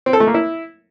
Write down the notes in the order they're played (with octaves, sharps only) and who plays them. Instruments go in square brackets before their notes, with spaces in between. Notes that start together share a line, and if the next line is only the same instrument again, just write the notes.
[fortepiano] C4
A4
A3
A#3
E4